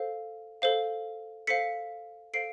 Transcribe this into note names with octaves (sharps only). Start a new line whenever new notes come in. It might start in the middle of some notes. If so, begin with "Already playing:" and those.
Already playing: A4 C5 F5
A4 C5 F5
A4 C5 F5 B6 C#7
A4 C5 F5 C7 D7